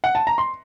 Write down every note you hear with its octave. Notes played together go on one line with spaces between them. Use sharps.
F#5
A5
A#5
C6